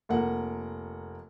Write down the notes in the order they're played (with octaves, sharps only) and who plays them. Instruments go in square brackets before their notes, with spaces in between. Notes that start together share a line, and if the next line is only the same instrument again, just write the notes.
[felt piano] F1 A#3 F#5